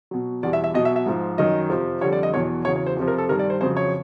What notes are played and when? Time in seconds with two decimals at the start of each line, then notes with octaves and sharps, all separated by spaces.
0.11 B2 F#3
0.43 E2 B2 G3 D5
0.53 E5
0.64 E5
0.74 B2 F#3 D#5
0.85 E5
0.96 E5
1.06 G#2 F3
1.38 F#2 D#3 F#3 D#5
1.70 F2 C3 F3
2.01 F2 D3 G3 C#5
2.13 D5
2.23 D#5
2.33 E2 B2 F#3 C#5
2.65 E2 C#3 F#3 C#5
2.76 C#5
2.86 C5
2.97 F2 C3 F3
3.08 A#4
3.18 A4
3.29 G2 D#3 G3 A#4
3.39 D5
3.50 C5
3.61 F2 C#3 F#3 C5
3.77 C#5